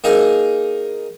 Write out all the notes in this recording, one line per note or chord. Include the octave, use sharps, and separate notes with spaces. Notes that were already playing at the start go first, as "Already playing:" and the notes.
A#3 D#4 G#4 A#4